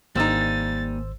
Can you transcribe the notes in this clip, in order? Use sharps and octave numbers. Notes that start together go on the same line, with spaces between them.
G#1 G3 A#3 D#4 C5 G#5 E6 A6